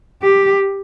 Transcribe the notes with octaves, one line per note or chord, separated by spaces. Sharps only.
G4